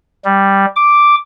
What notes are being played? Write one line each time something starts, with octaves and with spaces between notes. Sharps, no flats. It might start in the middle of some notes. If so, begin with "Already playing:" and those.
G3
D6